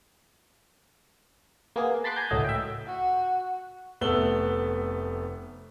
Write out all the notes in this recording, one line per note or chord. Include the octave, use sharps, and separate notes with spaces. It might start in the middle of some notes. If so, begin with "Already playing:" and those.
A#3 B3 G#4
A5 B5 C6 D6 F#6
G#5 A#5 G6
C#2 A2 F#3 A3 D#5
E5 G5
F#4
F1 A3 B3 E6 F#7 G7